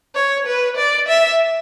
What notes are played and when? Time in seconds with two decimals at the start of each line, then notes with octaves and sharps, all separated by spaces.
0.15 C#5
0.47 B4
0.77 D5
1.08 E5